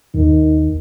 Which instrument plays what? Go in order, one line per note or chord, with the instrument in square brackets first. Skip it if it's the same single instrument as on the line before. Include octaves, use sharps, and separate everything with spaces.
[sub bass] D#2 [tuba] D#3